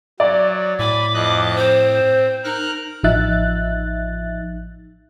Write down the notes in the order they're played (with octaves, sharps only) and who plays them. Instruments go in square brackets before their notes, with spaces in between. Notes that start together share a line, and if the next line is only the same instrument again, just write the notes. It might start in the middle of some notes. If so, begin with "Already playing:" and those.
[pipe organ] F#3 [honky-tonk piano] D5
[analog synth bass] A2 [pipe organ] G#5 B5 [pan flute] D6
[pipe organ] F2 D#5 F#6
[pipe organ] C4 [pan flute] C5
[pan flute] D#4 [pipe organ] A#4 F6 F#6
[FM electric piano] A1 F3 D#4 E5 F#6 A6